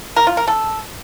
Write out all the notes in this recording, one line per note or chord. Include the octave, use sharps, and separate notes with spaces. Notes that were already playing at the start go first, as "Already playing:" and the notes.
A#4
F4
A#4
A4